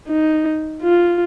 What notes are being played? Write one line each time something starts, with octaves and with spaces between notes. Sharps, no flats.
D#4
F4